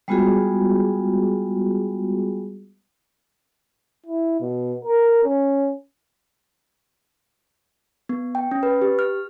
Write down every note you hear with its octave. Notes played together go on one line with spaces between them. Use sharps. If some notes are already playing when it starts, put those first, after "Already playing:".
G3 G#3 B3 F4 F#4 G#4
E4
B2
A#4
C#4
B3
G5
C#4
B4
G4
F6